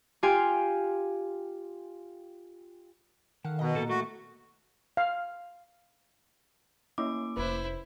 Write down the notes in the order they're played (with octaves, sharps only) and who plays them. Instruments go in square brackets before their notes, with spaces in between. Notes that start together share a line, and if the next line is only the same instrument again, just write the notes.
[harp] F4 G4 F5 G5 G#5
[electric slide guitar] D#3 [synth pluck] A4 F5 F#5
[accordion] B2 [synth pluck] D#5 F#5 A#5
[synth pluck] A#2 E3 A#3 [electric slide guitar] F#4 A4
[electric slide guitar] A3 [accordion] F#4
[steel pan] F5
[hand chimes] A#3 D6 [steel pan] C#4 E4 D#5
[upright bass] F1 D4 [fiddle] E4 C5 [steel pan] B4